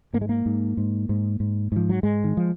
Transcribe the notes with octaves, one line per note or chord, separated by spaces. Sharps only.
G#2 A#3
G#3
A#3
G#2
G#2
G#2
G#2
G#2 F3
F#3
G#2 G#3
D#3
F3